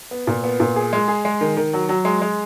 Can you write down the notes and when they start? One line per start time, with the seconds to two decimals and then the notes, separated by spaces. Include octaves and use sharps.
0.11 B3
0.27 A#2
0.44 B3
0.60 A#2
0.76 G#4
0.93 G#3
1.08 G#4
1.25 G#3
1.41 D#3
1.57 D#3
1.73 F#3
1.89 F#3
2.05 G#3
2.22 G#3